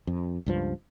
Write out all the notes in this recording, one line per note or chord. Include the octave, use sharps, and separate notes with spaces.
F2
C#2 G2 F3